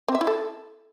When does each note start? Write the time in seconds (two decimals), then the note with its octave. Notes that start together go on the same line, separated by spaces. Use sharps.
0.08 C4
0.15 E5
0.21 E4
0.27 A4